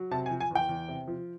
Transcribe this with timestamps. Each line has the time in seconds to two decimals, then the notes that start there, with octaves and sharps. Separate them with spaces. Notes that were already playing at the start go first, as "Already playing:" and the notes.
Already playing: F#3
0.11 C3 A5
0.26 G#5
0.30 F3
0.40 G#5
0.51 E2 G5
0.69 E2
0.88 C3
1.08 F3